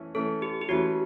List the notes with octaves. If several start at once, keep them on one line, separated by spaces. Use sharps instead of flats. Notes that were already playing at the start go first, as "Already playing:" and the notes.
Already playing: E3 A3 C#4
E3 A3 C#4 A4
G4
G4
E3 A3 C#4 F#4